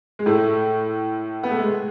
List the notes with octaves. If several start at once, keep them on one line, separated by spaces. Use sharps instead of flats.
G#3
A2 A3
B3
A3
G#3